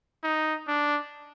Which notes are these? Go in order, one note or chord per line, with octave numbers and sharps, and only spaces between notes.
D#4
D4